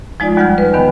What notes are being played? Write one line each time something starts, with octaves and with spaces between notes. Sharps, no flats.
F3 G#3 D#4 F4 D5
D#2 G3 F#5 F6 G6
B4
E2 B2 D3 D#3 B3 G5